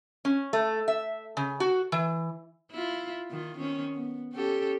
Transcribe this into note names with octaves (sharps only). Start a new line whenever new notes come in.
C#4
A3
E5
C#3
F#4
E3
E4 F4
D#3 F4
D#3 C4 C#4
B3
C#4 G4 A4